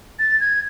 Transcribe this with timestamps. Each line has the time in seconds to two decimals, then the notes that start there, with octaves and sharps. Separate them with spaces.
0.19 A6
0.40 G#6